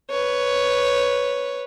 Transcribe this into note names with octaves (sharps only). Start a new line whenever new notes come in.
B4 C#5